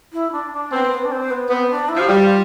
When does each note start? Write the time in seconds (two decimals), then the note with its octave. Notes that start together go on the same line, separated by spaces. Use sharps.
0.13 E4
0.32 D4
0.52 D4
0.72 B3 C4
0.91 B3
1.04 D4
1.11 C4
1.30 B3
1.50 B3 C4
1.70 D4
1.89 E4
1.96 F3 G4
2.09 G3 F4
2.24 F4